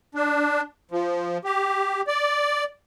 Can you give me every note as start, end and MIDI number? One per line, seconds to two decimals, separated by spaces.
0.15 0.61 62
0.91 1.38 53
1.45 2.01 67
2.07 2.64 74